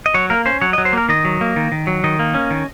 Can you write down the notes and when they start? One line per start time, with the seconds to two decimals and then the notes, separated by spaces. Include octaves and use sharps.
0.06 D#5
0.14 F#3 C#5
0.30 A#3 A#4
0.46 C#4 C5
0.61 F#3 C#5
0.73 D#5
0.78 F#3
0.85 C5
0.93 A#3 A#4
1.09 D#3 D#5
1.25 F#3
1.41 A#3
1.56 D#3
1.72 D#3
1.87 F#3
2.04 D#3 D#5
2.19 A#3
2.34 C#4
2.50 D#3